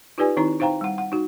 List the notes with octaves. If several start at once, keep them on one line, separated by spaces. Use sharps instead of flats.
D#4 F4 G4 B4 D5 G#5
D#3 C4 D#4 E4 A#5
D#4 C5 F5 G5 A#5
G3 F#5
F#5
D#4 F#4